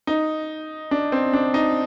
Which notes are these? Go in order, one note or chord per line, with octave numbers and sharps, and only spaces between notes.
D#4
D4
C4
D4
D#4